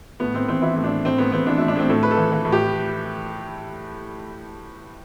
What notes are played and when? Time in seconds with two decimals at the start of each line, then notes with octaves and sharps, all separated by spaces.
0.20 A2 B3
0.34 A2 C4
0.48 E3 C4
0.62 E3 E4
0.76 A2
0.84 D4
0.90 A2
1.05 A2 C4
1.18 A2 B3
1.32 E3 C4
1.46 E3 D4
1.58 A2 E4
1.68 D4
1.76 A2 C4
1.89 A2 A4
2.03 A2 B4
2.11 A4
2.17 E3
2.32 E3
2.45 A2
2.52 G4